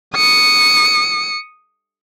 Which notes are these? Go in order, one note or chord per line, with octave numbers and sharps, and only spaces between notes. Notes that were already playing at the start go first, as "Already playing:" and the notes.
D#6 C#7